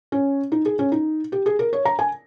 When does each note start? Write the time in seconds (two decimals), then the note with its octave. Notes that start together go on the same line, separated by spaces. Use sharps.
0.12 C#4
0.52 D#4
0.65 G#4
0.79 C#4
0.92 D#4
1.32 G4
1.46 G#4
1.59 A#4
1.73 C#5
1.85 A#5
1.99 G#5